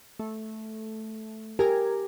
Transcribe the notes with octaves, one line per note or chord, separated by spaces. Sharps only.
A3
G4 A#4 G#5 A#5